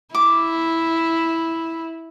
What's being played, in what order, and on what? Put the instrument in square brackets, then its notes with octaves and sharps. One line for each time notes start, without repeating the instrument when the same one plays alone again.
[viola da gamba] E4 [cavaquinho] D6